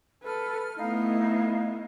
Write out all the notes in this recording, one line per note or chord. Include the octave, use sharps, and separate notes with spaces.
A4 B4 F6
A3 B3 D#4 E4 D#5 F5